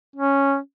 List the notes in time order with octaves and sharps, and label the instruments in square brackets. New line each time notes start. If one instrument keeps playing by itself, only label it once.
[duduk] C#4